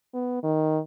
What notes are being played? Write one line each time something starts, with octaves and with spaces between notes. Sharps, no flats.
B3
D#3